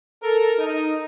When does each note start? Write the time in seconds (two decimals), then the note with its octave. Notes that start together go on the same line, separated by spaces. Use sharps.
0.22 A4 A#4
0.59 D#4